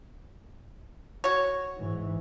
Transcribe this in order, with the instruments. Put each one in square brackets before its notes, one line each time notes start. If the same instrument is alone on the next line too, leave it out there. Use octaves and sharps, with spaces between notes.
[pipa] F#4 C#5
[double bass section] G#2 E3